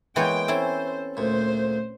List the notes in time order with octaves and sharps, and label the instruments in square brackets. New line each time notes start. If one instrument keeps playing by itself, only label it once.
[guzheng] E3 B3 C#5 [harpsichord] G#3 A#3 [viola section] G5
[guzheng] C4 C#4 E4 [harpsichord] A4 [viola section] C5
[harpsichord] D2 A#2 [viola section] C5